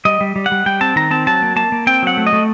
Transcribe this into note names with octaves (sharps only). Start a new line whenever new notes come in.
G3 D#5
G3
G3
F#5
G3
G3 G5
C4 A5
D#3 A#5
C4 A5
F#3 A5
A#3
A#3 A5
A#3
C4 G5
F#3 F#5
A3
D#5
A3